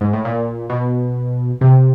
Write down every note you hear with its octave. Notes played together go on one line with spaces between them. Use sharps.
G#2
A2
A#2
B2
C3